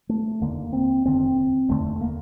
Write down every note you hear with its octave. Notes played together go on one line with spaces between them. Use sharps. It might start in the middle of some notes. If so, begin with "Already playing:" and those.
A3
F1 D#2 D3 A#3
C4
F1 D#2 D3 C4
F1 D#2 D3 A3
A#3